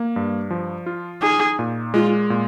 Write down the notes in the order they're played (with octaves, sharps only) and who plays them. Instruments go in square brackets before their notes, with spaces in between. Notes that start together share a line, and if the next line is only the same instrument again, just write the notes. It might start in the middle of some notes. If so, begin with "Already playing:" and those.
Already playing: [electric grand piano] A#3
G2
F3
F4
[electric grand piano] D#4 [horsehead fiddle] G#4
[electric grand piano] A#2
[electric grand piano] G#3 [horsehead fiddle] F4
[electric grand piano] A#2